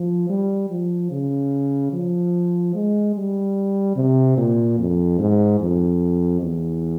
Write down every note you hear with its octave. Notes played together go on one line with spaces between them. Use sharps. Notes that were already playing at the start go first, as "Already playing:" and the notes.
Already playing: F3
G3
F3
C#3
F3
G#3
G3
C3
A#2
F2
G#2
F2
E2